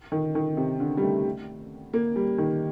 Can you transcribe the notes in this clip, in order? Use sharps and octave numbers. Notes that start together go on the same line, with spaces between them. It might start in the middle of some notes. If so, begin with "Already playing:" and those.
D#3
D#3
C3
D3
G3
A3
A#3
G3
D#3